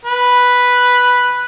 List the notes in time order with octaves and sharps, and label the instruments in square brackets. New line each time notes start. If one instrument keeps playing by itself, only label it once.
[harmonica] B4